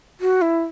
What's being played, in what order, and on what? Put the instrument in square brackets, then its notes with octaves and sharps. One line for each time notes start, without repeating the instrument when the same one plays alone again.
[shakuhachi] F#4
E4